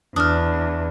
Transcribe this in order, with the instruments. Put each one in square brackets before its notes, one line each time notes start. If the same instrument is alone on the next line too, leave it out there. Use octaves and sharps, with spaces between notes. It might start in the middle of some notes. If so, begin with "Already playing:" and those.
[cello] E2 [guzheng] D4 [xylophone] D#6 F6